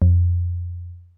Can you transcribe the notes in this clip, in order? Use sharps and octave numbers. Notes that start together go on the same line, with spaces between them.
F2